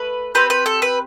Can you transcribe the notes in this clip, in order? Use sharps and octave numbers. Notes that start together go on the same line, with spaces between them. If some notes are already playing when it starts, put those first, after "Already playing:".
Already playing: A3 B4
C4 G4 B4
B4
A4
B4